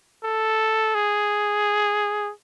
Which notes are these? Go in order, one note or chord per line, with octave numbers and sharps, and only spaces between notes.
A4
G#4